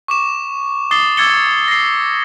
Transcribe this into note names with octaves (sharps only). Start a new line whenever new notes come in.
C#6 D6 E7
D6 D#6 A6 C7 G7
D6 E6 G#6 A6 C#7 G7
A#6 C7